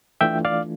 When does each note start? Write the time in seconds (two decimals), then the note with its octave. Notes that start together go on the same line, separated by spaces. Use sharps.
0.21 E3 A3 D4 F4 E5 G5
0.45 D5 F5